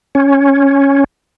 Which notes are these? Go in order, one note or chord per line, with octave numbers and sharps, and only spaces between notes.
C#4